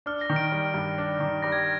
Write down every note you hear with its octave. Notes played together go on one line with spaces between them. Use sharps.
D4 F6
A#6
D#3
D7
G3
G2
D4
D#3
G3 A#6
G#6
A#6